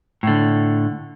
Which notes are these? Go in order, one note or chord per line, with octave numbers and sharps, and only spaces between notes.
A2 D3